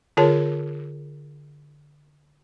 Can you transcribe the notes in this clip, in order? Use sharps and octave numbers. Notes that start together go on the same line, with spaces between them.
D3 F4 G#4 A#4 C#5 A5